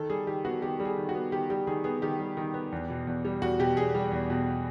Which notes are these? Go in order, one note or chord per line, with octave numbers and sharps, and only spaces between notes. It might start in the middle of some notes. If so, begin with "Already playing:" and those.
Already playing: D#3 A4
G3 G#4
D#3 G4
B3 F#4
D#3 G4
G3
G#4
D#3
F#4
B3
D#3 G4
G3 G4
D#3 G#4
B3 G#4
D#3 G4
G3
D#3
B3
E2
B2
E2
G3
E2 F#4
B2 G4
E2 G#4
G3
E2
B2